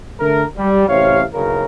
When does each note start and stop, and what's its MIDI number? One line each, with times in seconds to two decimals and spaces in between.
0.20 0.44 50
0.20 0.44 57
0.20 0.44 70
0.57 0.86 55
0.89 1.23 33
0.89 1.23 48
0.89 1.23 73
0.89 1.23 77
1.33 1.65 30
1.33 1.65 35
1.33 1.65 49
1.33 1.65 70